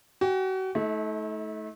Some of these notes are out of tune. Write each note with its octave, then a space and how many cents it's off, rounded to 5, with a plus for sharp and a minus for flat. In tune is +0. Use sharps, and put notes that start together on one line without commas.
F#4 +35 G5 +40
A3 -25 D#4 +45